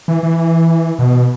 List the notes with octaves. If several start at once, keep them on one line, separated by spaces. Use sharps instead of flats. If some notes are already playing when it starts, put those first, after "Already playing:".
E3
E3
B2